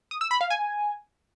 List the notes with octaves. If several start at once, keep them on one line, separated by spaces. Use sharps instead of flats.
D#6
E6
B5
F5
G#5